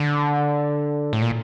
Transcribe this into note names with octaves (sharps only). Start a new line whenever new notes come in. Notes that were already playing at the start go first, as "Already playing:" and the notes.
Already playing: D3
A2
A#2